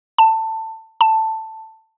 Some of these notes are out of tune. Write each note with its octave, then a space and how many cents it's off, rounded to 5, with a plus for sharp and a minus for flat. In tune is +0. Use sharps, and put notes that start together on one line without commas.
A5 +20
A5 +10